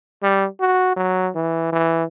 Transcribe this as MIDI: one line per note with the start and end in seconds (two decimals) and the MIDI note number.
0.23 0.47 55
0.60 0.93 66
0.96 1.30 54
1.35 1.71 52
1.72 2.04 52